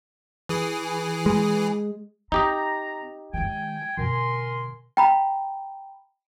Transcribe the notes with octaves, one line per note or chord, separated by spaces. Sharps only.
E3 G#4
G#3
C4 D#4 G4 D#5 A#5
D#3 G#3 G5 G#5
B2 D3 A#4 G#5 C6
G5 A#5 B5